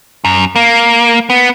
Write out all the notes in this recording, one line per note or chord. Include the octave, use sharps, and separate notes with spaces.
F#2
A#3
B3